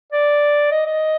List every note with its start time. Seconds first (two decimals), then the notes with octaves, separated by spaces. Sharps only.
0.12 D5
0.72 D#5
0.87 D#5